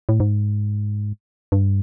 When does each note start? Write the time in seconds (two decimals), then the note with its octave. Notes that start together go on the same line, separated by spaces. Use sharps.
0.09 A2
0.20 G#2
1.52 G2